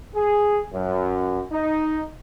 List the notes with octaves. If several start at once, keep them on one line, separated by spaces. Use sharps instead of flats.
G#4
F#2
D#4